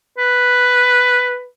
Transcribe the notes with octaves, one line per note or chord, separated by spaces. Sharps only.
B4